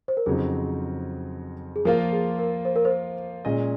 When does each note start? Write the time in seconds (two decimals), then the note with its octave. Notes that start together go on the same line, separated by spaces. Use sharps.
0.08 C5
0.17 A#4
0.26 F2 C#3 F#3 C4 D#4 G#4
1.76 G#4
1.85 F3 A#3 F4 A#4
2.12 G#4
2.39 A#4
2.65 C5
2.76 A#4
2.85 C5
3.45 A#2 G#3 C#4 G#4 D#5